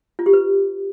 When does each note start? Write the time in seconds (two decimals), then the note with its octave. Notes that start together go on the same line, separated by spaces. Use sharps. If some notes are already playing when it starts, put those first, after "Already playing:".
0.19 F4
0.26 G4
0.33 B4